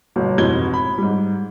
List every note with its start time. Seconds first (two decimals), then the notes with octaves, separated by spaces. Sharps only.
0.16 G1 B2
0.38 F1 G#2 B2 E3 G#6 G7
0.74 B5
0.98 G#2 G3